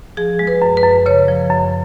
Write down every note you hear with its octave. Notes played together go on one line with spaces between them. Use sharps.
F3 G#4
G#3
B4
F#2
B4
F#2
C#3 C#5
F3
F#2